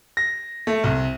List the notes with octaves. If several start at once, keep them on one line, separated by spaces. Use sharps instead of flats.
A#6
A3
C2